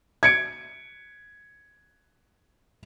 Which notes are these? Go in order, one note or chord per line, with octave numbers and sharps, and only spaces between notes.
G#6 C#7 D7